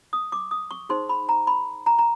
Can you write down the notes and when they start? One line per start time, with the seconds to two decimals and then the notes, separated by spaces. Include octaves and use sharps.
0.13 D#6
0.32 D6
0.51 D#6
0.71 C#6
0.89 D#4 G#4 C5 C6
1.09 B5
1.29 A#5
1.47 B5
1.86 A#5
1.99 A#5